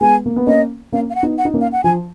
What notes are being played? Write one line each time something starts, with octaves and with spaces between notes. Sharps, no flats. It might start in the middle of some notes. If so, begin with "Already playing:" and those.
G#3 B3 G#5
A#3
B3
A#3 C#4 D#5
A#3 C#4 F5
F5
F#5
B3 D#4
F#5
D#4
A#3 C#4
F5
F#5
F3 G#5